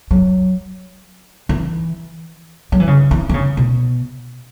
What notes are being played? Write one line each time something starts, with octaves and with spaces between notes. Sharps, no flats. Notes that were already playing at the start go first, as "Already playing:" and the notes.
F#3
E3
F#3
E3
C#3
E3
E3
C#3
B2